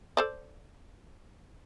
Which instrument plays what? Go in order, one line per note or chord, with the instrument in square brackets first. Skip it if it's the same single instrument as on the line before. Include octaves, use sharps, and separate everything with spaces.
[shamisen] A4 C5 D5